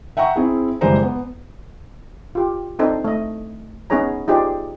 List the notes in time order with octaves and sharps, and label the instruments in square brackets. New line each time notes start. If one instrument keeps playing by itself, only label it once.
[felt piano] E5 F#5 G5 A#5 C#6
C4 E4 G#4
F#1 E3 G3 G#3 C5 A#5
B3
[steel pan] F4 G4
C4 D4 D#4 A4 C5
A3 D#5
B3 C#4 D#4 G#4 C#5 A#5
D#4 F4 G4 G#4 C5 D5